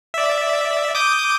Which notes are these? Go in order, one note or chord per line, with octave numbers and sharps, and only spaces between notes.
D5 E5
D6 D#6 G6